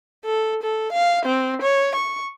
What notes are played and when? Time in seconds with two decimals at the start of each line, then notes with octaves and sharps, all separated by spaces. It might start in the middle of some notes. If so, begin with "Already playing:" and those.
0.25 A4
0.62 A4
0.92 F5
1.25 C4
1.61 C#5
1.95 C#6